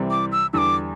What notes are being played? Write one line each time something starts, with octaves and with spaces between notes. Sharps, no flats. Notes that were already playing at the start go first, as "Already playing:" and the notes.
Already playing: C2 C3 E3 G3 C4
D6
E6
E2 D3 G3 D6 E6